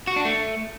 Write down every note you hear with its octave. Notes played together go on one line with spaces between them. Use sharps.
F#4
D4
A3